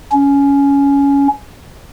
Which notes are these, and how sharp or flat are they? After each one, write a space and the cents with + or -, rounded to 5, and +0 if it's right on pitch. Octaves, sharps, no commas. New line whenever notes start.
C#4 +15